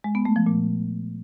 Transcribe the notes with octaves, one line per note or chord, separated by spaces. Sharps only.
G#3
B3
A3
F3
A#2